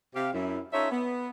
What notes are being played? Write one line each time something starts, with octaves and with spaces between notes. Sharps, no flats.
C3 G4 F5
F#2 E4
C#4 D#4 F4 A4 C#5 E5
B3